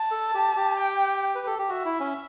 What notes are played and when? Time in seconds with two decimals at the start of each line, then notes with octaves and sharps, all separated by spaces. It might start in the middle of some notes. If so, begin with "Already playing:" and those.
Already playing: A5
0.11 A4
0.34 G4
0.56 G4
0.79 G5
1.35 B4
1.46 A4
1.59 G4
1.69 F#4 E5
1.85 E4
2.00 C#4